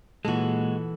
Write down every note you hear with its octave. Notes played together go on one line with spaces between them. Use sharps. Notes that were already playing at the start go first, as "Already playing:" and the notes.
A#2 E3 G#3 F#4 A4